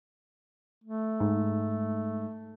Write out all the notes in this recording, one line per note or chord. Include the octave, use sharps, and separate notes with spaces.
A3
G#2